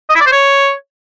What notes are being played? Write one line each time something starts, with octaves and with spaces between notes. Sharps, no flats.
D#5
E4
D5
C5
C#5